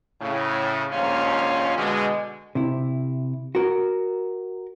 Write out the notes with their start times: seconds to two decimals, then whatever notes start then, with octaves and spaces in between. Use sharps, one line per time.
0.21 A2 C#3
0.92 A#1 D#2 G#2 C#4 F4
1.78 B2 D3 G#3
2.55 C3 E4
3.55 F#4 A#4